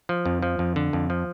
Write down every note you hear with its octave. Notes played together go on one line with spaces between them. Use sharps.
F3
F2
F3
F2
D3
F2
F3